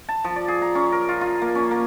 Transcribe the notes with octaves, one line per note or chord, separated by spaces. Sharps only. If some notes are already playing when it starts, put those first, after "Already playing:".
A5
F3
D5
G#4
A#5
C#4
A#4
F4
F4
A#3
C#4
A#3